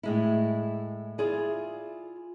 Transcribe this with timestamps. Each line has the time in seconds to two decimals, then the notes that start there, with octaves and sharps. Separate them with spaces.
0.03 A2 G#3 E4
1.18 E4 F4 G#4 D5